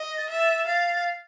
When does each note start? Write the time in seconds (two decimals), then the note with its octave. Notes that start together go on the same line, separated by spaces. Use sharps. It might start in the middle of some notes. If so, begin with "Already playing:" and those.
Already playing: D#5
0.17 A6
0.30 E5
0.67 F5 A6